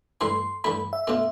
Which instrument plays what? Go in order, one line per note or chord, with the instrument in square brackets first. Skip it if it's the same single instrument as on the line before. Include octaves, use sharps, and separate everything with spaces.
[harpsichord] G2 E3 A3 E4 [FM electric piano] C6
[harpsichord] G2 E3 A3 E4 [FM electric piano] B5
[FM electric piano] E5
[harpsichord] B2 A3 D4 F4